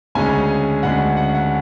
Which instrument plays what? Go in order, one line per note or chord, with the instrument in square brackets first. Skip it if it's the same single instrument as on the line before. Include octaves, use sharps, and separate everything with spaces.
[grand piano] D2 C#3 G#3 C#4 G#5
D2 C#3 G#3 C#4 F#5
F#5
F#5